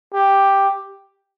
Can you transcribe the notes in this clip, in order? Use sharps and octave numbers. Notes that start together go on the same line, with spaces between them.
G4